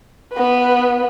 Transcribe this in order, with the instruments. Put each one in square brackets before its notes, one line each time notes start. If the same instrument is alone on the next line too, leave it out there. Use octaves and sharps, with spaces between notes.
[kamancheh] B3 B4